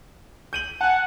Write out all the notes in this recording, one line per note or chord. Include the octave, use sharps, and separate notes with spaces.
G6 D#7 F#7
F#5 G#5 A5